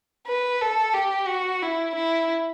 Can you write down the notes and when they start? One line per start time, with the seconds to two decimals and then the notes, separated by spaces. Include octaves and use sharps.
0.27 B4
0.61 A4
0.94 G4
1.28 F#4
1.63 E4
1.96 E4